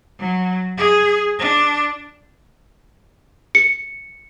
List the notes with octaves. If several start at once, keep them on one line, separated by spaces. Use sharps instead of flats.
F#3
G#4
D4
C#7